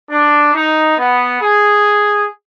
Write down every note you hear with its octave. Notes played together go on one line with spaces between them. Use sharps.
D4
D#4
B3
G#4